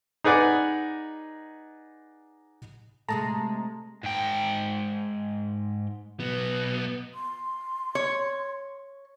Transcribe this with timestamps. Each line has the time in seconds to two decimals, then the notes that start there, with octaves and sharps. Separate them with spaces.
0.24 D#4 G#4 B4 D5 F#5
3.09 C3 G#3 A3 A5 A#5
4.03 G#2 G5
6.20 B1 B3
7.14 C6
7.95 C#5